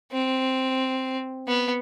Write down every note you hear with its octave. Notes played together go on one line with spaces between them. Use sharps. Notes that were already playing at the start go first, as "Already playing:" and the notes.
C4
B3